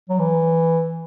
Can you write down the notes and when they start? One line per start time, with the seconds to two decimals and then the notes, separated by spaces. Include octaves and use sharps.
0.09 F#3
0.19 E3